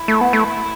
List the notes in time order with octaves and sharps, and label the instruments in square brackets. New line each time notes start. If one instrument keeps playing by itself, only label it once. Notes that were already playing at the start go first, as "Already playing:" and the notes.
Already playing: [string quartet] E4
[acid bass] A3
B3
A3